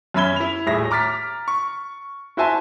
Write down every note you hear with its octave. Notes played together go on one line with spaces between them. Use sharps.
F#2 C#4 E5 B5 G#6 G7
E4 F7
D#1 A2 G3 G#4 E5 A#6
A#5 D6 F6 A6 B6
C#6
E4 F#4 C5 E5 G#5 A5